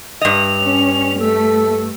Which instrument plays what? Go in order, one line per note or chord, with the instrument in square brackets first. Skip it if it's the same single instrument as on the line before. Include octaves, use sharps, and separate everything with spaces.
[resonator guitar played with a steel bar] G2 D#5 [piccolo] F7
[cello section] C#4
[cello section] A3 [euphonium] A4 [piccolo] E6